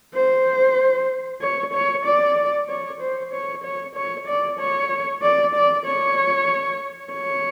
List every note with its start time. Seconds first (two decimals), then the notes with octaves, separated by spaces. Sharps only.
0.15 C5
1.42 C#5
1.73 C#5
2.05 D5
2.69 C#5
3.01 C5
3.33 C#5
3.64 C#5
3.95 C#5
4.27 D5
4.60 C#5
5.22 D5
5.55 D5
5.86 C#5
7.13 C#5